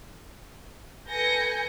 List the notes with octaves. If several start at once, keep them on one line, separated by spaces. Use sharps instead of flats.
A4 B4 G#5 G6 A#6 C#7